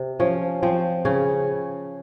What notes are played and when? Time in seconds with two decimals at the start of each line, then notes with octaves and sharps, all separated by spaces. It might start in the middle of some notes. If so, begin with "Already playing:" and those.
Already playing: C3
0.20 F3 C#4
0.63 F3 C4
1.05 C#3 C#4